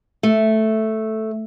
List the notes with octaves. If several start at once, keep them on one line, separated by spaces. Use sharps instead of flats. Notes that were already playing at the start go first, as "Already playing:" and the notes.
A3